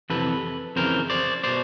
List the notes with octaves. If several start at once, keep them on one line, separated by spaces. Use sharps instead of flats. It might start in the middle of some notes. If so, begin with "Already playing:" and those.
F2 C3 E3 A4 B4
F2 C#3 E3 A#4 C5
C5 D5
B2 C5 D5